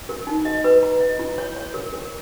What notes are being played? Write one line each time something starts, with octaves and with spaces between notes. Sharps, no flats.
A#4
D#4
D#5
B4
A#5
D#5
E4
C#5
C#5
A#4
A#4